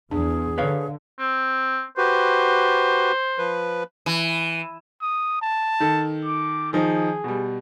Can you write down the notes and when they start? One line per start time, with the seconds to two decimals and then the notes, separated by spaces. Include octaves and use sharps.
0.11 E2 D4 G#4
0.58 D3 B4 C#5 F5
1.19 C4
1.97 F#4 G4 B4 C5
3.38 F3 B4
4.06 E3
5.01 D#6
5.42 A5
5.80 D#3 A4
6.25 D6
6.73 D#3 F3 D#4 G#4
7.24 B2 G3